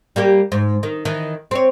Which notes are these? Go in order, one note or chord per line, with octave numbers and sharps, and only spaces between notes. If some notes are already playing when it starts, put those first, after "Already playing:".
G3 A#3 G4
G#2
D#3
D#3 E3
C4 C#5